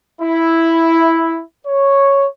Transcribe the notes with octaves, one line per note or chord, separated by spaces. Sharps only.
E4
C#5